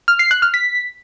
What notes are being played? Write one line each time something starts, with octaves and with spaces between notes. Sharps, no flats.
F6
C7
F#6
F6
B6